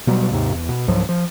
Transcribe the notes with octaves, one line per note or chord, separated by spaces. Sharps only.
B2 F#3 G3
D#2 G#2 C3
E2
B2
C#2 G#2 F3 F#3
F3